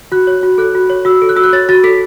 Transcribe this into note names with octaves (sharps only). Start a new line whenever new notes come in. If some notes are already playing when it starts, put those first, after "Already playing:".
F#4 F#6
C#5
F#4
A4 F#6
F#4
C#5
F#4 E6
A4
F#6
F#4 E6
F#6
C#5 A6
F#4 A6
A4 B6